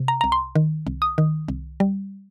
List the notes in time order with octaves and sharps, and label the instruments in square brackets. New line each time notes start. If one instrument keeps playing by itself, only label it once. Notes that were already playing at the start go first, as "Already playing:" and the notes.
Already playing: [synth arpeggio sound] C3
A#5
C2 A#5
C6
D#3
C2
D#6
D#3
C2
G3